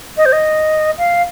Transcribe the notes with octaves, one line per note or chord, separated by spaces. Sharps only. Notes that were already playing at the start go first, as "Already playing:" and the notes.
D#5
C5
D#5
F5